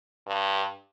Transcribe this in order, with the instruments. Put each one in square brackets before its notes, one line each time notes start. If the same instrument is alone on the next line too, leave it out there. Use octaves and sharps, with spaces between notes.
[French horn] G2